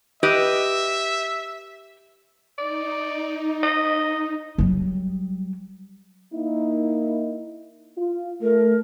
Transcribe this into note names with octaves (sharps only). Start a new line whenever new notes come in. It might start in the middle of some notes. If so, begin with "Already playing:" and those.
G4 B4 D#5 E5
D#4 D5
D#5
F#3 G3
A#3 D#4 E4
F4
A3 A#4